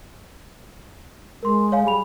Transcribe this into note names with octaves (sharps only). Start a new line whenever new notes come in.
G#3 A#4 C6
C#5 F5 G#5
G3 G#4 B5 F7